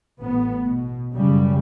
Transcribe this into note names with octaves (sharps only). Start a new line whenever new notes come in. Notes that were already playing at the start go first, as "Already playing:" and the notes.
A1 B3
B2
F#2 C#3 G3